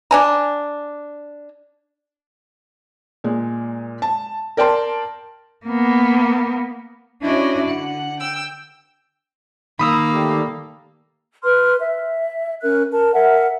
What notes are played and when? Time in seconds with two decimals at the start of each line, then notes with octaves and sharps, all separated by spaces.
0.11 D4 G#5 A#5
3.24 A#2 G#3
4.02 A5
4.57 A#4 D5 G5 A5 C6
5.66 A#3 B3
7.21 C#4 D4 E4 F#4 D5 D#5
7.68 D3 F#5
8.19 G5 E6
9.79 D#3 A#3 B5 D#6 E6
10.12 G3 A3 G4
11.44 B4 C6 F6
11.81 E5
12.62 C#4 A#4 F#6
12.91 A#4 A5
13.14 A#4 E5 F#5